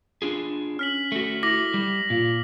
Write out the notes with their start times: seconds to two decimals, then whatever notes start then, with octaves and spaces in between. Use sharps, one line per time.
0.22 D4 F4 G#4
0.79 C#4 F6 B6 F#7
1.12 A3 F#4
1.43 E4 D6 A#6 F#7
1.74 G3
2.10 A#2 F4